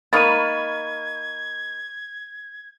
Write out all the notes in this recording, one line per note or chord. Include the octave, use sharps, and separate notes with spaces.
A#3 D#4 B5 C#6 F6 G#6 A6 D#7